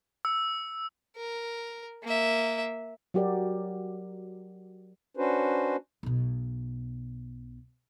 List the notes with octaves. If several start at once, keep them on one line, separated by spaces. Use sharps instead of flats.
E6
A#4
A#3 E5
F#3 F#4 G4 A#4 D5
C#4 D4 F#4 B4 C5
B1 B2